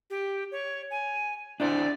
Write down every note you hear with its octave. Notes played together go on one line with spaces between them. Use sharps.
G4
C#5
G#5
D4 E4 C5 D5